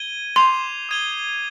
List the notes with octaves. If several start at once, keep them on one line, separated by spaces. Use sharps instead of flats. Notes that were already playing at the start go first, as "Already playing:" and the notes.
Already playing: G#6 D#7 G7
C6 D6 G6 C7 F7
D#6 G#6 D#7 G7